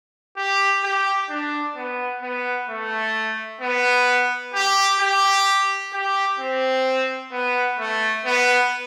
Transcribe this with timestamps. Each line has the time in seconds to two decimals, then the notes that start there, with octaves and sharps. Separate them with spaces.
0.37 G4
0.83 G4
1.30 D4
1.76 B3
2.22 B3
2.69 A3
3.61 B3
4.54 G4
5.00 G4
5.93 G4
6.39 C4
7.32 B3
7.79 A3
8.25 B3